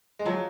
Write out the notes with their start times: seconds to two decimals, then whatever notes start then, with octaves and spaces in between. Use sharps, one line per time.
0.19 G#3
0.26 F3 F#3